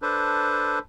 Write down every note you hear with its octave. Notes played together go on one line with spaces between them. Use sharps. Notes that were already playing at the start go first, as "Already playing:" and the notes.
D4 A4 B4 C5